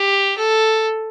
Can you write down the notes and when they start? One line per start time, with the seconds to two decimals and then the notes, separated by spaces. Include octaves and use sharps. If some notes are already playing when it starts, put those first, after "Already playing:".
Already playing: G4
0.37 A4